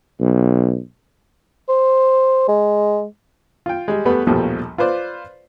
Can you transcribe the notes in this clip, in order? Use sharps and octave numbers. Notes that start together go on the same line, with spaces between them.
B1
C5
G#3
F4 G5
G3 G#3
E2 G3 A3 B3 B4 B5
A#1 D#2 B2 F3 G3 A3
F4 B4 C5 D5